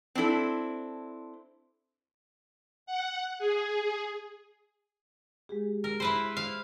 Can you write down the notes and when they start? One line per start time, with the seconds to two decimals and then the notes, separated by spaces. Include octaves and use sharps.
0.15 C4 D4 E4 A4
2.86 F#5
3.39 G#4
5.49 G#3 G4 G#4
5.84 G#4 A#4
6.00 E4 B4 C5
6.37 F5